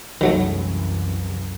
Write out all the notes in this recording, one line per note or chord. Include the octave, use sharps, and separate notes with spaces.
C2 F#2 D#3 E3 F#3 A3